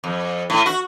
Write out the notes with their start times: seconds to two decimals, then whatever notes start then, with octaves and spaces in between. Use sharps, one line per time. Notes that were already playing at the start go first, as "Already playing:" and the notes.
0.04 F2
0.50 A2
0.66 F#4